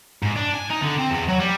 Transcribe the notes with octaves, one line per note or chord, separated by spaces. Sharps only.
G#2
D4
G#5
D#4
D3
C4
E2
F#3
G3